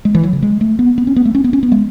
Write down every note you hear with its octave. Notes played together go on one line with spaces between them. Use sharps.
G#3
E3
F#3
C#3
G#3
A3
B3
B3
C#4
B3
A3
C#4
B3
C#4
B3
G#3